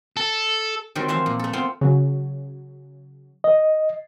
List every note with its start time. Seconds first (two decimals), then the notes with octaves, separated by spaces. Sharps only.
0.17 A4
0.95 D#3 F#3 G3 C4
1.08 E3 F3 E5 F5 C6
1.26 A#2
1.39 A3 A4
1.53 B3 C4 F4
1.81 C#3 F#3
3.44 D#5